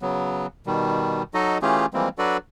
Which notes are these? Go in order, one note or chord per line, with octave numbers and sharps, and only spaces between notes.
C#3 F#3 B3
B2 D#3 G3
F#3 D#4 F#4 A4 D#5
E3 A3 C#4 F4 G4 G#4
E3 F3 G3 G#3 A#3 C4
F#3 D4 F#4 A4 B4 D5